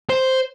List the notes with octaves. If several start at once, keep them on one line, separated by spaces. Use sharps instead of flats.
C5